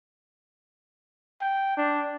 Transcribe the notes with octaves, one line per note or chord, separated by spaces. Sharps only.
G5
D4